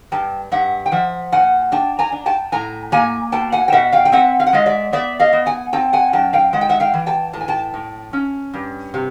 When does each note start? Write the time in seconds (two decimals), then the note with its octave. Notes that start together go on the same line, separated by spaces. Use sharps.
0.12 G2 G5 A5
0.52 G2 E5 F#5
0.86 G5
0.92 F3 E5 F#5
1.32 A#2 F#5 G#5
1.72 D4 G5 A5
1.99 G#5 A#5
2.12 D4
2.26 G5 A5
2.52 A2 G#5 A#5
2.92 A#3 G#5 A#5
3.32 B2 G5 A5
3.52 F#5 G#5
3.68 G5
3.72 B2 E5 F#5
3.92 F5 G5
4.05 G5
4.12 C4 E5 F#5
4.40 F5
4.47 F#5
4.53 G#3 D#5 F5
4.66 D5 E5
4.93 B3 D5 E5
5.20 D#5 F5
5.33 B3
5.46 F#5 G#5
5.73 C4 G5 A5
5.93 F#5 G#5
6.13 F#2 G5 A5
6.33 F5 G5
6.53 G#3 F#5
6.61 G5
6.69 E5 F#5
6.80 F5 G5
6.93 E3
7.06 G5 A5
7.33 A2 A5
7.41 G#5
7.48 G5 A5
7.74 A2
8.13 C#4
8.54 G2
8.94 C3